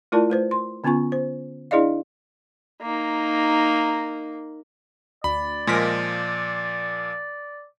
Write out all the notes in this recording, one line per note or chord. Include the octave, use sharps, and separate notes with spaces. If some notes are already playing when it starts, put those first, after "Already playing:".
A3 E4 F4 A#4 D5 A5
A3 B4 C5
C6
D3 B3 C#4 F4 G#5 C#6
C5
D4 E4 G#4 D5 D#5 F5
A#3 D#4
D2 D5 B5
A#2 F3 G#3 A#4 B6